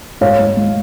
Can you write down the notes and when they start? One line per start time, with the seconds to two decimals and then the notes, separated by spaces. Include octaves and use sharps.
0.21 G#2 C#5 F5
0.39 G#3
0.57 G#3